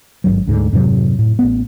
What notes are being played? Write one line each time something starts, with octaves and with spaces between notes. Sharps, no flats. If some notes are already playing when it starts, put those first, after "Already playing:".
G#1 C#2 G2 F#3
D2 G#2 D3
F2 G#2 C3 F#3
A2
A1 B3